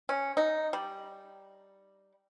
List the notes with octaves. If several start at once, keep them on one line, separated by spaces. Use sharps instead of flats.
C#4
D#4
G3